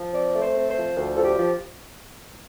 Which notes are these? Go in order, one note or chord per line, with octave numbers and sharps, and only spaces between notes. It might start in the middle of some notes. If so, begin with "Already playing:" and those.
Already playing: F3
C4 D5
A3
C5
C4
C5
F3
D2
F3 A4
G4
F3